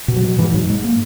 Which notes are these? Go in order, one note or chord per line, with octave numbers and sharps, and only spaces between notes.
B2
F#3
B2
G#2 E3
G#2 F#3
G#2 G#3
A#3